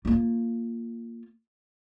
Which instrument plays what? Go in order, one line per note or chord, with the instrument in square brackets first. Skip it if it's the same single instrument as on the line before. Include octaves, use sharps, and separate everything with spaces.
[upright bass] A#3 F4